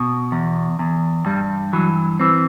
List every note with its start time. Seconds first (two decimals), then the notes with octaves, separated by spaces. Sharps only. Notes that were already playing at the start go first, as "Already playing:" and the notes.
Already playing: B2
0.32 E2
0.79 E2
1.26 G2 G3
1.73 E3 F#3
2.20 E3 C4